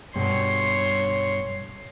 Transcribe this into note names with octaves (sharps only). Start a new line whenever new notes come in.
G2 B2 C#5 C6